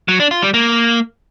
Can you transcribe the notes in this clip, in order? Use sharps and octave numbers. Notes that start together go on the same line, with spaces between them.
F#3
D4
F4
G3
A#3